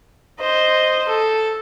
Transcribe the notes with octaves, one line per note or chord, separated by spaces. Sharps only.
C5 D#5
A4